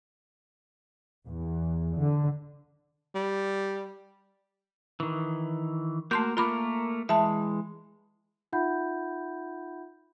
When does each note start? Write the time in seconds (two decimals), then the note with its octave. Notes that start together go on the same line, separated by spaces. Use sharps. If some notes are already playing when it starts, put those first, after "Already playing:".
1.28 E2
1.98 D3
3.15 G3
5.00 D#3 E3
6.11 A3 A#3 F#4 A#4 C6 G6
6.37 A3 A#3 F4 A#4 B5 D6
7.09 E3 G#3 E5 A5
8.53 D#4 F4 E5 F#5 B5 G6